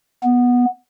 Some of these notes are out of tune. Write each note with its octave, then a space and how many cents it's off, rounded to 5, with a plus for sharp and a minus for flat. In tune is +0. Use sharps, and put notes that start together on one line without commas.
B3 -10